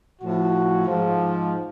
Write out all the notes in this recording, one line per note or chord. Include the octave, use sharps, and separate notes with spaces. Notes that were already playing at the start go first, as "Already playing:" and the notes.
A2 F3 F#4
G#2 F3